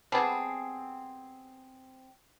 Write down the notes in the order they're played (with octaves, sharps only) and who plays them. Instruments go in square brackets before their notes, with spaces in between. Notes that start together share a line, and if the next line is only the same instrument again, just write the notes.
[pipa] G3 B3 G#4 [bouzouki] C4 [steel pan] A5